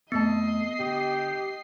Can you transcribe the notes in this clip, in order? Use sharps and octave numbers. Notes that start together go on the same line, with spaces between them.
F2 A3 B3 D#5 A5 C7
D3 G4